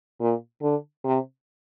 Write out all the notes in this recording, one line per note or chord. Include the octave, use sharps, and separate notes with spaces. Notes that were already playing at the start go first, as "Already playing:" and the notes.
A#2
D3
C3